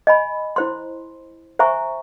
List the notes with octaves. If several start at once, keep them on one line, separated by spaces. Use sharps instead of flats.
D#5 G#5 B5
E4 C5 C6
C5 E5 G#5 A#5 C#6